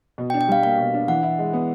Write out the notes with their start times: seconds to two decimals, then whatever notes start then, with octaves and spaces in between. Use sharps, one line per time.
0.18 B2
0.30 G5
0.34 D4
0.41 G5
0.48 G3 F5
0.63 A#3 F5
0.78 B2
0.94 D4
1.08 E3 F#5
1.23 E4
1.39 G#3
1.53 B3